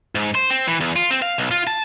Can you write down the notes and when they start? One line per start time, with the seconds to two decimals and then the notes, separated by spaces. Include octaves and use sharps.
0.15 G#2
0.35 C5
0.50 C4
0.68 E3
0.81 E2
0.96 F4
1.11 C4
1.22 F5
1.38 B1
1.51 F4
1.67 A5